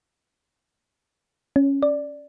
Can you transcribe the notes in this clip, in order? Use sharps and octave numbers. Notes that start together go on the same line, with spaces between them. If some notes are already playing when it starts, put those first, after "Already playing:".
C#4
D5